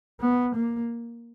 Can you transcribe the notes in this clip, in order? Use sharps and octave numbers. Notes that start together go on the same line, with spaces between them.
B3
A#3